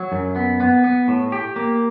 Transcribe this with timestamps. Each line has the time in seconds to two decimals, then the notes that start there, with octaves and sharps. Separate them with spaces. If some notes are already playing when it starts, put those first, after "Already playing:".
Already playing: F#3
0.12 F#2
0.36 B3
0.60 B3
0.84 B3
1.08 A2
1.32 G4
1.56 A#3